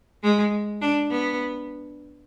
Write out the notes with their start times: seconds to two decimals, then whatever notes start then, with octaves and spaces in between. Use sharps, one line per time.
0.23 G#3
0.81 D4
1.11 B3